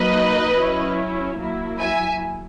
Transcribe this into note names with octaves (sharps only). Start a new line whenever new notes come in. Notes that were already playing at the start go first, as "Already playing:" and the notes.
Already playing: F#3 A#3 D#4 B4 D#5
F#3 C#4 E4
F#3 A#3 E4
E5 G#5